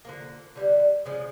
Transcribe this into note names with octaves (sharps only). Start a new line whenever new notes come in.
D3 F3 A#3
D3 G3 B3
C#3 F3 G#3